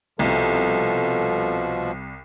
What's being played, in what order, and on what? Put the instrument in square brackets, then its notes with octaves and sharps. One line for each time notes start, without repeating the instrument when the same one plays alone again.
[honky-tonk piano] C2 [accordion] B2 F3 [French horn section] A4